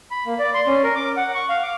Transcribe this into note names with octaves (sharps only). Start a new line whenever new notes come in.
B5
A#3
D5
C6
C#4
A#4
D6
F#5
C#6
F5
D6